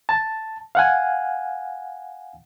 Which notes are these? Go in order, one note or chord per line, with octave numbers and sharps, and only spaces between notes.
A5
F5 F#5 G#5